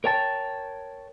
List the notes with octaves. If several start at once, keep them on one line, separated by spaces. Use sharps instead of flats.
A#4 C#5 G5 A5